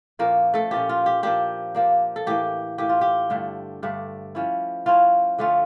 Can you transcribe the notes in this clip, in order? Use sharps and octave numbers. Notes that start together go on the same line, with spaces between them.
A#2 F3 A#3 C#4 A#4
A3 A4
A#2 F3 C#4 G4
F4
G4
F3 A#3 D4 G4
F3 A#3 D4
A4
A2 E3 A#3 G4
A2 E3 A#3 G4
F4
G4
G2 D3 A3 D4
G2 D3 A3 D4
F3 C#4 E4
F3 C#4 E4 F4
D3 A3 C#4 F4